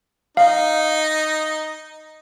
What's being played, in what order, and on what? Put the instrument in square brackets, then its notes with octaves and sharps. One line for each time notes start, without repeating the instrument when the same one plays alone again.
[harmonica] D#4 [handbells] F5